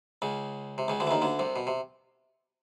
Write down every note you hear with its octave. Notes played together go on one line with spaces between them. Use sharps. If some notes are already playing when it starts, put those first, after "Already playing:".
C#2 C#3
C3
C#2 C#3
D2 D3
E3
D#2 D#3
D2 D3
C2 C3
B2
C3